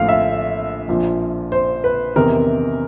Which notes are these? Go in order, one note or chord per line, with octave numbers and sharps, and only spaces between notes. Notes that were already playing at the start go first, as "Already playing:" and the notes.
Already playing: A#1 A2 F3 F5
E5
A#1 A#2 F3
C5
B4
E2 C3 D#3 A#4